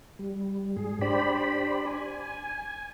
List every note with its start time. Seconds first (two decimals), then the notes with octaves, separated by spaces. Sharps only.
0.19 G3
0.77 G#2 G#4
1.01 D4 G4 C5 D5 B5
1.87 G#5